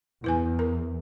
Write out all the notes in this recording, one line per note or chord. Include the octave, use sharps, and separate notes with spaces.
E2 E4 B4 G#5
A#4